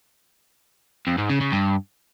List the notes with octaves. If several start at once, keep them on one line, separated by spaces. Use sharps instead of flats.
F2
G#2
C#3
C#3
G2